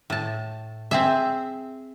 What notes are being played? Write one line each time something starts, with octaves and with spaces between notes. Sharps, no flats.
A2 A5
C4 G#4 E5